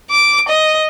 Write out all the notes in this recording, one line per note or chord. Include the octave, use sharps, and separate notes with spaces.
D6
D#5